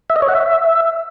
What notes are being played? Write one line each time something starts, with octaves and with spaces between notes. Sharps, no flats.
E5
D#5
C#5
F#5
E5